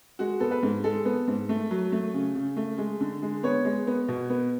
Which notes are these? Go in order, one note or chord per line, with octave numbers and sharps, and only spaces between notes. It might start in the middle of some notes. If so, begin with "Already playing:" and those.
G#3 F#4
B3 A4
B4
G#2
G#3 A4
B3
G#2
A3
F#3
A3
C#3
C#3
A3
G#3
D3
G#3
B3 C#5
G#3
B3
B2
B3